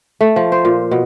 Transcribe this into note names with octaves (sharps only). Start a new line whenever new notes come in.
A3
F3
C5
A#2
B2